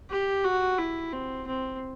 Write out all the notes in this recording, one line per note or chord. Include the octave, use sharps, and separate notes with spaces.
G4
F#4
E4
C4
C4